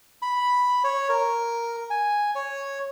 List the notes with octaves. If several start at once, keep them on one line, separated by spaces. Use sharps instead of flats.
B5
C#5
A#4
G#5
C#5